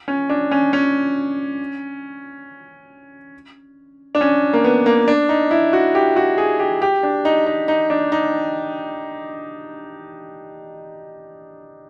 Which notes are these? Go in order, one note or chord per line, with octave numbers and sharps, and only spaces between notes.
C#4
D4
C#4
C#4
D4
C#4
A#3
B3
A#3
D4
D#4
E4
F#4
G4
F#4
G#4
G4
G4
D4
D#4
D#4
D#4
D4
D#4